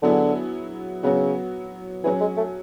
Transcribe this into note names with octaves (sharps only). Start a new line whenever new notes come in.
D3 F#3 B3 E4 G#4
C#3 F#3 B3 F#4
E3 F#3 C#4 G#4
G#3
A3